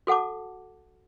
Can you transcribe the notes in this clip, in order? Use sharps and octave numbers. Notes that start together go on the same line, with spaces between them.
F#4 A4 F#5 A5 D6